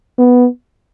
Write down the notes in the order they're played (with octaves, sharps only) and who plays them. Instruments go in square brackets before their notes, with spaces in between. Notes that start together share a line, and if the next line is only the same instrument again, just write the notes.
[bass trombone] B3